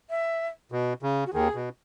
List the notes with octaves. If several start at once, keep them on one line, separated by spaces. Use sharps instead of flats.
E5
B2
C#3
F#4
D#2 D#3 G#4
B2